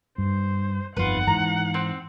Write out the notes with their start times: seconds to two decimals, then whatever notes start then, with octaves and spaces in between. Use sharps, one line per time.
0.18 G2 C5
0.97 G1 F2 D#4 F4 B4 F#5
1.27 G#2 E3 A#5
1.74 C4